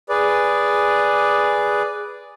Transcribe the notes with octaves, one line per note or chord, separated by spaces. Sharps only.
G#4 B4 D5